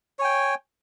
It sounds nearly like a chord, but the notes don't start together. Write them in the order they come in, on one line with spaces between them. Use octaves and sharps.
C#5 G#5 G5